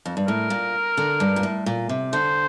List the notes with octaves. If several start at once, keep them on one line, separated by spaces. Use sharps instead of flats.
F2
G2
A2 A#4
A#2
D3
G2
A#2
A2
A#2
C3
D3 C5